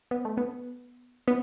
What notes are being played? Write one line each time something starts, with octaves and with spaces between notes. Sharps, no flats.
B3
A3
B3
B3